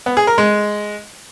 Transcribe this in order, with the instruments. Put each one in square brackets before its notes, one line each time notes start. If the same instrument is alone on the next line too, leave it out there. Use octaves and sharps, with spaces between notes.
[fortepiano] B3
G#4
A#4
G#3